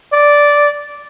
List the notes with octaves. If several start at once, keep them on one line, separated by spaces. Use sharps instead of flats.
D5